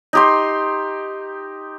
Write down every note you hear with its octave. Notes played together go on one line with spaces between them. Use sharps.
D#4 G4 C6